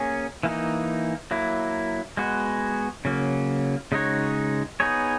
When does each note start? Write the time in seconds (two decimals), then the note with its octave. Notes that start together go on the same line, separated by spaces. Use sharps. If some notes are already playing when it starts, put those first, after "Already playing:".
Already playing: A#3 C#4 G#4 C#5
0.43 E3 A#3 D#4
1.31 F#3 A#3 E4
2.17 G#3 B3 F#4
3.05 C#3 F#3 A#3
3.92 C#3 G#3 D#4 F#4 C#5
4.80 B3 D#4 G#4 C#5